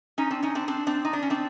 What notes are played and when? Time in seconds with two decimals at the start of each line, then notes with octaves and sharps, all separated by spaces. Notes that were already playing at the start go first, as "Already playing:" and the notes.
0.18 C#4 D#4
0.31 C4 D4
0.43 C#4 D#4
0.55 C4 D4
0.68 C4 D4
0.87 C4 D4
1.05 D#4
1.13 D4
1.23 C#4
1.30 C4 D4